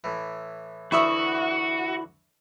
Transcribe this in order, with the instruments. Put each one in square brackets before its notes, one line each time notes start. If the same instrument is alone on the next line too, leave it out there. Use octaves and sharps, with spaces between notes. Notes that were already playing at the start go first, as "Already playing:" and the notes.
[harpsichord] A2 E3
[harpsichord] D2 E3 E5 [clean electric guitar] E4 [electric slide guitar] F#4 [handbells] B5 C#6 D#6